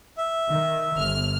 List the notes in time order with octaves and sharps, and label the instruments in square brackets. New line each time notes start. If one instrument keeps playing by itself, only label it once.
[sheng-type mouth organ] E5
[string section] D#3
G1 F6